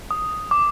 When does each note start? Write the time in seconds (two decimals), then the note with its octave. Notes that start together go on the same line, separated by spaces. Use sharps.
0.11 D#6
0.51 D6